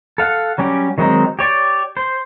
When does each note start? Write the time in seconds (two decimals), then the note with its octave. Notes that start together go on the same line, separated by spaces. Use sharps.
0.18 A4 F5 F#5
0.58 F#3 G3 C#4 G4
0.98 D#3 F#3 G#3 C4 D#4
1.39 G4 C#5 D5
1.97 C5